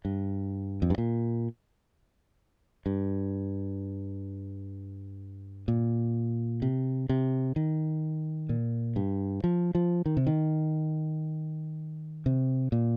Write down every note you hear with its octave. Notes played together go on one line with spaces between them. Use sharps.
G2
F2
G2
A#2
G2
A#2
C3
C3
D#3
A#2
G2
F3
F3
D#3
C3
D#3
C3
A#2